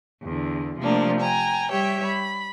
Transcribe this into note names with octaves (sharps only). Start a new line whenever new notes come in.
E2 D3
C3 F3 A3 A#3 D4 A#4
G5 G#5 A#5
G3 G4 C#5 E5 G5
B5